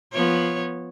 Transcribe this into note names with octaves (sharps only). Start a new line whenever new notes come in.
F3 B3 C#5